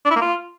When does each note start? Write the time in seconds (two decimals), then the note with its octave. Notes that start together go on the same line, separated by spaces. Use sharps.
0.05 D4
0.11 E4
0.16 A#3
0.21 F4